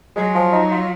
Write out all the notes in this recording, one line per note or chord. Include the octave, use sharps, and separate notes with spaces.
F#3 G#3
F3
D#4
F4